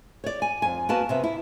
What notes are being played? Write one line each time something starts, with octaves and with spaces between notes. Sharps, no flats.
C#5 D5
G#5
F2 G#5
A#3 B3 F#4 A5
C3 B3 E5
E4